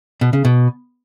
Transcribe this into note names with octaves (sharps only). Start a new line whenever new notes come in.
B2
C#3
B2